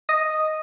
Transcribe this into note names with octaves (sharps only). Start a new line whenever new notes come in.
D#5